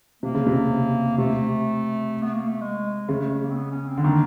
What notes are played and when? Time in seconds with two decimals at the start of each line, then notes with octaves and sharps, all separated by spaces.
0.23 C3 A#3
0.35 C#3
0.47 C3
1.18 C3 A3
2.23 B3
2.35 A#3
2.48 A3
2.61 G#3
3.08 C#3 A3
3.20 A3
3.32 A3
3.44 A#3
3.50 C4
3.56 B3
3.72 C#4
3.88 C4
3.97 D3
4.04 D#3 A#3